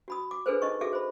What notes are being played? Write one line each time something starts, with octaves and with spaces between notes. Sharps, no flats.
F#4 B5 D#6
D6
D4 G#4 A4 B4 C5
D#4 D#5 C#6
F#4 G#4 A4 E5 D6
C5 B5